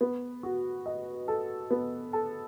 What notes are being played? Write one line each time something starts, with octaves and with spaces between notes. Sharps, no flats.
B3
F#4
D#5
A4
B3
A4